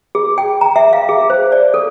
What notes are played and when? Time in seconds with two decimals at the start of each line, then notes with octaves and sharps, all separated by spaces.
0.15 G#4
0.38 G5
0.61 A#5
0.76 E5
0.93 F5
1.09 G#4
1.30 C5
1.52 D5
1.74 A4